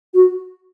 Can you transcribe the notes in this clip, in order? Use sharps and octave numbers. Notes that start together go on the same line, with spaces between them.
F#4